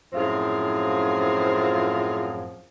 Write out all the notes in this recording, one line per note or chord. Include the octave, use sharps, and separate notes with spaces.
F#2 A2 F3 C4 F4 G#4